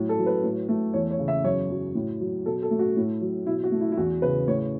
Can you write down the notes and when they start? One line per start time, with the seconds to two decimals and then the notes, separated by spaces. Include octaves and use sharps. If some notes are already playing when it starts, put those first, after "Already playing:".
Already playing: A2 F#3
0.09 A4
0.18 F#3
0.26 B4
0.44 A2
0.69 A3
0.93 E2 C#5
1.11 C#5
1.19 C#3
1.28 E5
1.44 F#2 C#5
1.70 F#3
1.95 A2
2.21 F#3
2.46 B2 A4
2.63 A4
2.71 A3
2.79 F#4
2.96 A2
3.21 F#3
3.46 B2 E4
3.64 F#4
3.72 A3
3.81 E4
3.92 E4
3.97 E2 F#4
4.22 C#3 B4
4.47 A2 C#5